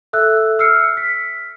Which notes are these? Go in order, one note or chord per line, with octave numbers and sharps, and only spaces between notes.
A4 E5 E6 F#6
E6 F6 C7 C#7
B6